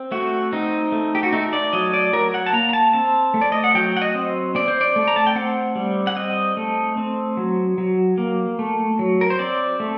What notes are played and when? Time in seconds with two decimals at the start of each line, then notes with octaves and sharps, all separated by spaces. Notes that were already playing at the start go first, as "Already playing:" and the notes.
Already playing: C4
0.12 A3 F#4
0.53 C4 D#4
0.92 A3
1.15 G4
1.23 F#4
1.33 A3 D#4
1.53 D5
1.73 F#3 D#5
1.94 D5
2.13 F#3 A#4
2.34 F#5
2.46 A5
2.53 A#3 A#5
2.69 A#5
2.73 A5
2.93 C4 A5
3.34 A3
3.41 D5
3.52 D#5
3.64 F#5
3.75 F#3 G5
3.97 F#5
4.02 D#5
4.15 C4
4.55 C4 D5
4.68 C5
4.81 D5
4.96 A3
5.08 A#5
5.16 A5
5.27 G5
5.36 C4 F#5
5.76 G3
6.07 F#5
6.16 C4 D#5
6.57 A3
6.97 C4
7.37 F#3
7.78 F#3
8.18 A#3
8.59 A3
8.99 F#3
9.21 A#4
9.30 C5
9.39 C4 D5
9.80 A3